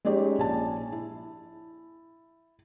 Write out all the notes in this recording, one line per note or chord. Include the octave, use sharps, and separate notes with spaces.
G#3 C#4 D#4 G4 C#5 D5
A#1 G#5 A5
E4